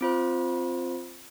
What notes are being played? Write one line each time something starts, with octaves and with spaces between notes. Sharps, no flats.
C4 F4 C5